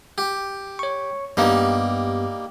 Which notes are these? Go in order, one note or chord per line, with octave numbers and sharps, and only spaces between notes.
G4
C#5 C#6
G2 G3 A#3 B3 D#4 G4